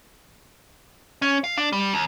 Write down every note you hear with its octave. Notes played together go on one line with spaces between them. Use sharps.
C#4
F5
D4
G3
D#2